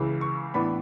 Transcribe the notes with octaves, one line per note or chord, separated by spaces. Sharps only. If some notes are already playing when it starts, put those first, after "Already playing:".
Already playing: C#2 C#3 E3
C#6
A2 E3 B3 D4 B5